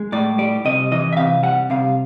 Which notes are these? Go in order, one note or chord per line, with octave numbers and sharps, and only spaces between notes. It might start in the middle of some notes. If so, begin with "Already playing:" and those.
Already playing: G#3
A2 D5
G3 D5
C3 D#5
E3 D#5
E5
C3 F5
G3 F#5
C3 F5